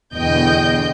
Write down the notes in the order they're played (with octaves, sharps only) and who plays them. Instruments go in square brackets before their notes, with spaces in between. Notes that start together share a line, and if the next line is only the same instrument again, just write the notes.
[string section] E2 B2 D3 D#5 G5 G6